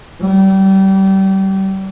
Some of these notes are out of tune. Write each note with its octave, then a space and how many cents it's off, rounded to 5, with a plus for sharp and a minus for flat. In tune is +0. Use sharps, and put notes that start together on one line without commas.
G3 -30